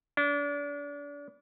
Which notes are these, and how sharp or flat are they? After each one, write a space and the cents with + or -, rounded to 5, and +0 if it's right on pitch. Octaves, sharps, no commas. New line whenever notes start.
D4 -35